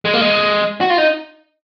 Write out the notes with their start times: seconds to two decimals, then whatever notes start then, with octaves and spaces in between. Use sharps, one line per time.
0.05 G#3
0.14 A#3
0.21 G#3
0.81 F#4
0.90 F4
0.98 D#4